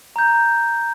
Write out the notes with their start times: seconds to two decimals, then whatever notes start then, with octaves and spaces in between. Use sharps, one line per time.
0.16 A#5 G6